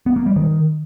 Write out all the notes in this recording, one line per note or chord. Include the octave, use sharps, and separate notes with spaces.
B3
A#3
G3
D#3